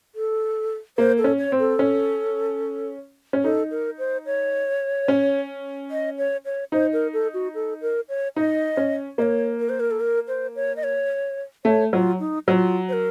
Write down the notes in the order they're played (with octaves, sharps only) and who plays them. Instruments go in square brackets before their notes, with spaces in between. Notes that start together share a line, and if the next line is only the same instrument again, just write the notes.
[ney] A4
[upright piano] A#3 [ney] C5
[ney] A4
[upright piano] C#4
[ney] C#5
[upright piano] C4
[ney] A4
[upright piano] C#4
C#4
[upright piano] D#4 [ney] A4
[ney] A#4
C5
C#5
[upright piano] C#4
[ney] D#5
C#5
C#5
[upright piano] D#4 [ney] C5
[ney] A#4
A4
F#4
A4
A#4
C#5
[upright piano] D#4 [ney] D#5
[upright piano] C#4
[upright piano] A#3 [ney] D#5
[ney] C#5
A#4
C5
A#4
A4
A#4
C5
C#5
D#5
C#5
[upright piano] A3 [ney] C#5
[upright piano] F#3 [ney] F4
[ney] D#4
[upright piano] F#3 [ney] F4 F#4
[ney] C5
A#4